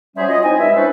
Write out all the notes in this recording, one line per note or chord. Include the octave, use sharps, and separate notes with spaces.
F#3 G3 C#4 G#4 C5 E5
F#3 F4 C#5 D#5
C4 D#4 E4 G#5
G2 G#3 D#5 E5
C#4 D4 E4 A4 B4 C5